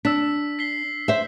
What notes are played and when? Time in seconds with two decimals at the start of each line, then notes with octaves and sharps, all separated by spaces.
0.05 D4 E6 B6
0.59 B6 C7 G7
1.08 C5 E5